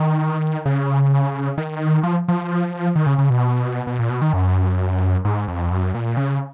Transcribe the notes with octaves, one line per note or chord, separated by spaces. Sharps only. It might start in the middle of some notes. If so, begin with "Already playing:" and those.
Already playing: D#3
C#3
D#3
F3
F3
D#3
C#3
C#3
B2
B2
A#2
B2
D#3
F#2
G#2
F2
F#2
A#2
C#3